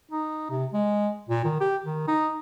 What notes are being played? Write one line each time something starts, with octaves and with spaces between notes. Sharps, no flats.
D#4
C3
G#3
A#2
D#3
G4
D#3
D#4